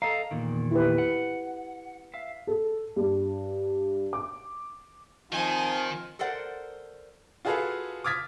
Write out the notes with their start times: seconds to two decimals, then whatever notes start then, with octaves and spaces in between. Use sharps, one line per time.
0.02 A4 D#5 F5 A#5
0.31 E2 A#2 D#3
0.71 E4 G4 B4
0.98 F#5
2.14 E5 F5
2.47 A4
2.96 G2
4.13 D6
5.32 D#3 F3 C4 D#4 F4 G#5
6.19 A4 A#4 C5 D5 F#5
7.45 F4 F#4 G#4 A4 B4 F5
8.04 D6 D#6 F6 G#6 A6 B6